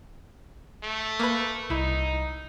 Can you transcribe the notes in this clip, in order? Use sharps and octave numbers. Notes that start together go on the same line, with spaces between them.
A3
A#3 B4
C2 D#4 E4